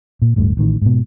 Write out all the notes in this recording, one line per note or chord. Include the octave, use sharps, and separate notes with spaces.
A#2
D1 G2 A3
A1 A2 D#3
G#2 B2